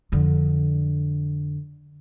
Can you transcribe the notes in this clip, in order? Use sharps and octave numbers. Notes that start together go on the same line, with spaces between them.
F2 D3